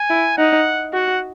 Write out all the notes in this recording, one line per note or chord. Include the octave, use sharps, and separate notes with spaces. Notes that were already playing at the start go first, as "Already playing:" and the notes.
Already playing: G#5
E4
D#4 F#5
F#4 F#5